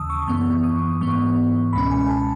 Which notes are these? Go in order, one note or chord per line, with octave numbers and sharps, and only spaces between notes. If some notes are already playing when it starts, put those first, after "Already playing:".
Already playing: D#2 C#3 E3 A5 D#6 E6
C#6
F#2 E3 B3 C#6
D#6
G#2 E3 B3 C#6
C#2 B2 G#3 C#4 B5
G#5
A5